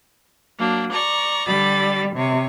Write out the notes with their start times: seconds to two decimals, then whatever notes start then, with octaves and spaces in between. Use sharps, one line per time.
0.58 F#3 A#3 D4
0.91 D5 A#5 C#6
1.46 D3 G3 B5 A6
2.16 C3 C#5